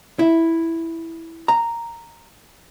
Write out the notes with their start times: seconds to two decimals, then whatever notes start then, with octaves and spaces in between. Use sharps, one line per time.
0.19 E4
1.48 A#5